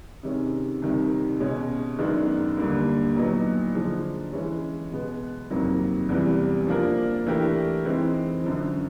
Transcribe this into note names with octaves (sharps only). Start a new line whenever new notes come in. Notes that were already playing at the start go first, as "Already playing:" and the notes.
C3 D#3 G#3 C#4
C2 C3 D#3
B2 G#3 C#4
F#2 D#3 G#3 B3 D4
D#2 D3 G3 A#3
A#2 F#3 B3 D#4
D3 F3 G#3
E3 G#3 C#4
B2 G#3 B3
F2 C3 D#3 F#3 A#3
E2 C3 E3 G3
F3 A#3 D4 F4 A#4
E3 A3 D4 G4 A#4
E3 G#3 C4 D#4
F#2 D3 F3